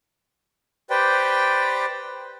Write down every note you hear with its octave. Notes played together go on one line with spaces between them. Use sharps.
G4 B4 C5 D5 G5